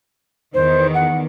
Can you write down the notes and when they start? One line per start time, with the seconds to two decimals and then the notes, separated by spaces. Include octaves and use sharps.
0.54 E2 D#3 C5
0.94 F#5